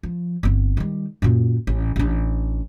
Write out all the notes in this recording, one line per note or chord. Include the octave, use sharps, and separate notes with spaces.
F3
G1 C4
D#3 G3
F#2 A#2
A1
A1 D4